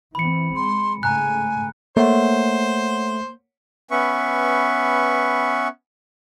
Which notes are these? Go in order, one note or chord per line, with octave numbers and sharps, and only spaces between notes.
E3 C4 B5 C#7
G#3 C6
G#2 C#3 A3 G#5 A#5 F#6
A3 A#3 C5 C#5 F#5
B3 C#4 B4 E5 C#6